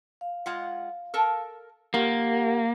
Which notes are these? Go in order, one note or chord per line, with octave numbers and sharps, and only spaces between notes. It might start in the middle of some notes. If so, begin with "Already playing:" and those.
F5
G#3 F4 F#5
A4 A#4 A5
D#3 F3 A#3 G4 A#4 F#5